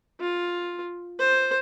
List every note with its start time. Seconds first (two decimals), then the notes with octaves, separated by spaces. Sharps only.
0.20 F4
1.19 C5